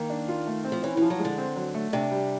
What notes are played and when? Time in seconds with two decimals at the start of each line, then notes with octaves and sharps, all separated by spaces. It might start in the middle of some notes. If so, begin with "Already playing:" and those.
Already playing: D#3 A#3
0.10 D4
0.28 F4
0.47 A3
0.65 C4
0.72 F3
0.83 E3 C#4
0.97 E3 F3
1.10 F#3
1.19 G#3
1.25 D3
1.38 C4
1.56 F#3
1.74 A3
1.93 C3 D4
2.11 G3